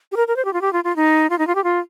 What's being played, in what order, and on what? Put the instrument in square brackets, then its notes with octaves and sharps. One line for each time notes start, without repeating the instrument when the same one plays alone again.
[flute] G4
A#4
A#4
C5
G4
F4
G4
F4
F4
D#4
F4
D#4
F4
G4
F4